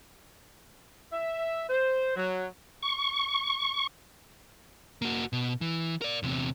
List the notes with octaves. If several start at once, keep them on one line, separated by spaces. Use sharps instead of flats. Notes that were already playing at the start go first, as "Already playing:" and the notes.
E5
C5
F#3
C#6
A#3 F#4
B2
E3
A#4 D5
E2 C3